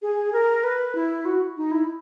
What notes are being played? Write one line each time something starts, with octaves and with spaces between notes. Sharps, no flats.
G#4
A#4
B4
E4
F#4
D#4
E4